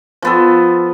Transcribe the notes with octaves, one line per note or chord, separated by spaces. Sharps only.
F3 B3 A4